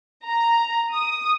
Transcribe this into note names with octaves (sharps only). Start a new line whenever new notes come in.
A#5
D#6